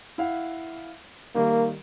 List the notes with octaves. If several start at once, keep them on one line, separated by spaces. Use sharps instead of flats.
E4 F5 F#5
D#3 G3 A#3